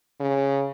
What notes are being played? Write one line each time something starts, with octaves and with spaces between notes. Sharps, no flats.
C#3